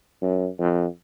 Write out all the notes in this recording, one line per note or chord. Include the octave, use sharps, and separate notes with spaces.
F#2
F2